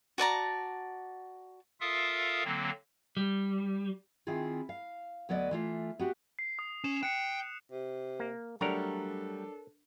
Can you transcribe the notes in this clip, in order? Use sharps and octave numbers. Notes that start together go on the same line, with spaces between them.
F#4 D5 A5 A#5
F4 A4 A#4 E5 F5 D#6
D3 F#3 A#3 C4
G3
D#3 C4 E4 F4 G#4
F5
D2 F#3 B3 D5 D#5
E3 A3 F4
B3 F#4 G4
C7
D#6
C#4 E7
G5 F#6 C#7
C3
A#3
F#3 G3 A3 D4 A4 A#4 C#5 A#5